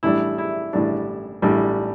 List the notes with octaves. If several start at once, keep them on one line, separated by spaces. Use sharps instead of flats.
A1 A2 G3 D4 E4
E4
A1 A2 G3 D4
A1 A2 G3 D4